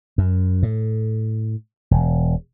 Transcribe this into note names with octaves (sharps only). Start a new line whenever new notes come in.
F#2
A2
E1